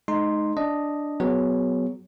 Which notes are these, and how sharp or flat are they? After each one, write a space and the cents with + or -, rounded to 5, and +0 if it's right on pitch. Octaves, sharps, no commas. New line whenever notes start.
G#3 +35 D#4 -10 C6 +0
D4 +0 D#5 +0
F#3 +0 B3 +10 G#4 +0